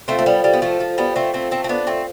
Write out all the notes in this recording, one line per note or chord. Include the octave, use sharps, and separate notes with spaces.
A3 C4 F4 A4 C5 F5
A3
G3 B3
G3
B3
F3 A3
F3
G3 B3
A3 C4
A3 C4
A3 C4
C4
B3 D4
A3 C4